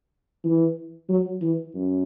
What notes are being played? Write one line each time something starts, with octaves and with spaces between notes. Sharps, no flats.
E3
F#3
E3
F#2